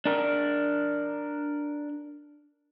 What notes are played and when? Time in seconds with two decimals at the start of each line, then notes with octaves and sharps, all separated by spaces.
0.05 D4 A#4